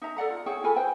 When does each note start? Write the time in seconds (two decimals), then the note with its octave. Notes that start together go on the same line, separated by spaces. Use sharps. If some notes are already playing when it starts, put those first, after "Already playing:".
0.02 D#4 E5 A#5
0.16 A4 D5 F#5 A#5
0.30 F4
0.46 E4 G#4 C#5 G5
0.64 F4 A4 G#5 B5
0.76 B4 C5 G5